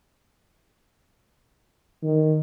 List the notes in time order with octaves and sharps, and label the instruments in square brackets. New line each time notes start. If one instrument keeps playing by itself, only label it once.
[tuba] D#3